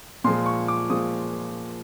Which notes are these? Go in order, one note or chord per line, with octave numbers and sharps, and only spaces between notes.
A#2 F3 G#3 C6
C#6
D6
A#2 F3 G#3 D#6